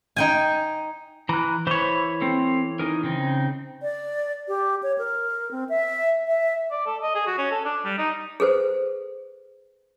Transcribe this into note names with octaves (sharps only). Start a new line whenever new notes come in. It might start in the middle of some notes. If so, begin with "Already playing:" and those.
D#4 G5 G#5
E3 A#5 F#6
E3 C5 C#5 B5
C4 A4
D#4 G#4 A#4
C#3 C4 D#4
D5
G4
C#5
A#4
C4
E5
E5
D5
A4
D#5
G#4
F#4
C#4
A4
D4
G3
D#4
G#4 A4 B4 C5